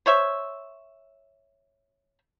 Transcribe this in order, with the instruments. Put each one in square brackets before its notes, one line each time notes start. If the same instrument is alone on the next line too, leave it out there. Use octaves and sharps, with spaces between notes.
[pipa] C5 C#5 E5